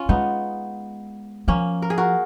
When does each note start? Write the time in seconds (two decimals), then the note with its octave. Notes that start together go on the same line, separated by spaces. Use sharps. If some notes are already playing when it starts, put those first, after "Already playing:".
Already playing: C#4 F4
0.09 G#3 B3 D#4
1.48 F3 A#3 C#4
1.82 A#4
1.90 G#4
1.98 F#4 A#4